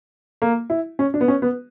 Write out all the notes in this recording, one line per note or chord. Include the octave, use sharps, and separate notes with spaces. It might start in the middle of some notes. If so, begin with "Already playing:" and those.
A#3
E4
C#4
D4
B3
C#4
B3